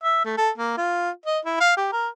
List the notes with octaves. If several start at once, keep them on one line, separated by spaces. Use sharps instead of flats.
E5
A3
A4
A#3
F4
D#5
E4
F5
G4
A#4